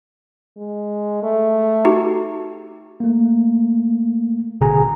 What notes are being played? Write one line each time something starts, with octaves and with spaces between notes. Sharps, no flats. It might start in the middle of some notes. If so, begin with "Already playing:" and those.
G#3
A3
D#4 F#4 G4
A3 A#3
A1 B2 D3 G#4 G#5 A#5